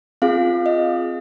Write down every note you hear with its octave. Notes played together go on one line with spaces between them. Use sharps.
C4 F4 G#4 F5
D#5